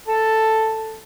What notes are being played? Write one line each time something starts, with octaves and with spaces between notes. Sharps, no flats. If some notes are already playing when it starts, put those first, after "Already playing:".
A4 A5